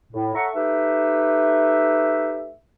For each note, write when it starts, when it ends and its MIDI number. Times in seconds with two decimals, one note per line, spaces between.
0.12 0.31 45
0.34 0.47 69
0.34 0.47 73
0.34 0.47 76
0.34 0.47 78
0.34 0.47 82
0.34 0.47 85
0.54 2.50 57
0.54 2.50 63
0.54 2.50 67
0.54 2.50 71
0.54 2.50 76